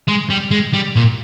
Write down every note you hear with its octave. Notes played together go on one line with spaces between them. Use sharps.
G#3
G3
G#3
G3
A#2